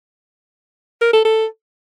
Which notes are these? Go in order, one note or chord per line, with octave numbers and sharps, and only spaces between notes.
A#4
A4
A4